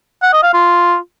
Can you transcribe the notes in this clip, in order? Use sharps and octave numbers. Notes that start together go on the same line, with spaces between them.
F#5
D#5
F5
F4